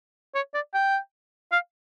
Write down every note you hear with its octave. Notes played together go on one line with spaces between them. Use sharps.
C#5
D5
G5
F5